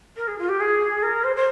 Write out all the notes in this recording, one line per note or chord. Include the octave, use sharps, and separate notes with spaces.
A#4
G#4
F4
G4
G#4
A#4
C5
C5